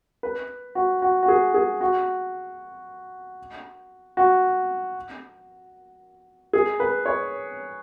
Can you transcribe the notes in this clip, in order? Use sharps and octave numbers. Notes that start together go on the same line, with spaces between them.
B4
F#4
F#4
F#4
G#4
G#4
F#4
F#4
G#4
B4
C#5